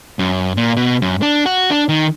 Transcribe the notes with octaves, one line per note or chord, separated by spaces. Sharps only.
F#2
A#2
B2
F#2
D4
F#4
D4
D#3